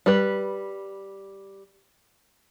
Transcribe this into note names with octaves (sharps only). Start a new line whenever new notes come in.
G3 B4